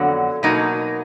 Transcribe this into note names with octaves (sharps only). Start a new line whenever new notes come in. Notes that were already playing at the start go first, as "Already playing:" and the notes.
Already playing: F2 D3 F#3 B3 F#5
B2 F#3 A#3 D#4